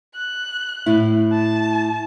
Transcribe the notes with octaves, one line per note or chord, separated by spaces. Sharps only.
F#6
A2 E4
A5